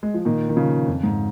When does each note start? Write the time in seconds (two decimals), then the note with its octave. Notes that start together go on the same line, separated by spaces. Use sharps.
0.03 G#3
0.14 F3
0.25 A#2 D#3
0.49 D#3
0.56 C#3 F3
0.88 F2
1.03 G#2